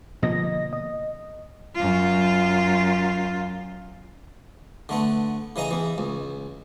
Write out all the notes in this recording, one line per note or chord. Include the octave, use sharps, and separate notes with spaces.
B2 D3 F3 A#3 D#5 A#6
D#5
F#2 F4
D3 A3 B3
C#3 E3 D#5 A#5
E2 E3
C#2